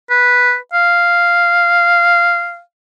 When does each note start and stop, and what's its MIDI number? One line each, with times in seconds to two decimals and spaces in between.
0.10 0.56 71
0.74 2.60 77